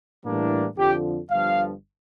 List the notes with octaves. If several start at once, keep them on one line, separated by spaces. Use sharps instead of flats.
A2 E3 G3 A#3 D4
F2 D3 F3 G4
G1 G2 D3 F3 F5